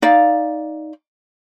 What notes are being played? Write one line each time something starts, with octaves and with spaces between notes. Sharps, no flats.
D#4 D5 F5